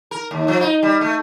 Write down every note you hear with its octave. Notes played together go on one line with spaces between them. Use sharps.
A#4
D#2
F3
D#4
G3
A3